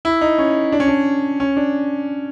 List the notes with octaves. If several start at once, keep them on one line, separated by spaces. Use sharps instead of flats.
E4
D#4
C#4
D4
C#4
D4
C#4
D4